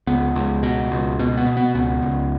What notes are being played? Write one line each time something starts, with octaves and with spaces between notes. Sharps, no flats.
C#2 B3
C#2
B2
C#2
B2
B3
B2
B3
C#2 B3
C#2